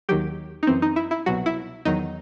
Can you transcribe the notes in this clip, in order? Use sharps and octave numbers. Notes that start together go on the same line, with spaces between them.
D#2 D#3 F#3 G4
D#4
F#2 E3 C4
D#4
E4
E4
C2 B2 F#3 F#4
E4
E2 D#3 F#3 D#4